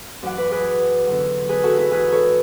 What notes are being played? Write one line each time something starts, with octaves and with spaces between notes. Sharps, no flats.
F#2 E3 D5 F#5
B4 D5
G#4 B4
E2 D3 F#3
G#4 B4
F#4 A4
E4 G#4
G#2 E3 G#4 B4
A4 C#5